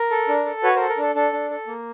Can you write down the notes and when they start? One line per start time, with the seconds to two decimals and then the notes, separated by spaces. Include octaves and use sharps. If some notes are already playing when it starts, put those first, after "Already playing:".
Already playing: A#4
0.11 A4
0.28 D4
0.46 A4
0.63 F#4 B4 C#5
0.76 A#4 C5
0.80 A4
0.89 A#4
0.98 D4 A4
1.15 D4 A4
1.33 D4
1.50 A4
1.67 A#3